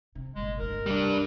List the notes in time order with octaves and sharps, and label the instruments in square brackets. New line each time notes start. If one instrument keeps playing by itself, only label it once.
[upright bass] C3
[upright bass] G1 A#2 [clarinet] G#3
[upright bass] D2 [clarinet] A#4
[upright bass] C#2
[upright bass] C2 [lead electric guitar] G3 D4